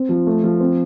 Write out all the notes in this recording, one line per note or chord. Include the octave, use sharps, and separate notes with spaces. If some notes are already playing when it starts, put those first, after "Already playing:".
Already playing: C4
F3
A3
F3
C4